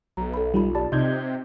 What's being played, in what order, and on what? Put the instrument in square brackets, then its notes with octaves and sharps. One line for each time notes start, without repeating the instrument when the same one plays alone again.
[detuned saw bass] B1 [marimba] A#5
[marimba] A4 B5
[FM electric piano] G3 [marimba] D#4 F4 B5
[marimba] G4 B5 [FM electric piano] D5 A5
[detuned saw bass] C3 [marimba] C4 D#4 D5 [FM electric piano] D#5 G6 G#6